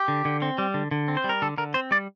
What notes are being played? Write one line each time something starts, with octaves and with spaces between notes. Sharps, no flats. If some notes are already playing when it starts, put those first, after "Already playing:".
Already playing: G4
D3
D3
C4
G3
D3
D3
C4
C5
G3
A#4
D3 A4
D3 A#4
C4 C5
G3 D5